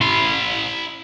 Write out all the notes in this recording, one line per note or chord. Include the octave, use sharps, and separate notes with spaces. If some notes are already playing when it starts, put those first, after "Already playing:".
E4 C6